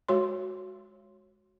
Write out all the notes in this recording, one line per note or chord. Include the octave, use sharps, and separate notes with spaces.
G#3 F#4 C#5 C6